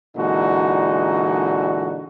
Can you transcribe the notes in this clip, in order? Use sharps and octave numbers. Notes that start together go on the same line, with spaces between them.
A#2 D3 E3 G#3 D#4 F#4